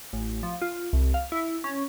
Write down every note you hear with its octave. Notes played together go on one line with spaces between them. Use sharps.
A1
F3
F4
C2
F5
E4
C#4